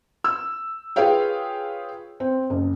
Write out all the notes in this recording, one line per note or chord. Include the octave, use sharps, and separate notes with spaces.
E6
F4 G#4 B4 C#5 F5 G5
C4
F#1